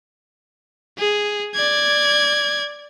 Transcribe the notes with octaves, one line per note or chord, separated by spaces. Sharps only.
G#4
D5 G#6